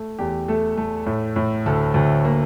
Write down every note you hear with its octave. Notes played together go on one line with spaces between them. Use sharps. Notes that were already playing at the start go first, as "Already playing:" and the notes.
Already playing: A3
E2 G4
A3 A4
A3
A2
A2
D2 A4
D2
A#3